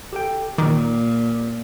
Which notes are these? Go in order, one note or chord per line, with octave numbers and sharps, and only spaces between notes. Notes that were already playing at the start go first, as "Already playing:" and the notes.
G4 A4 G5
A#2 D#3 D6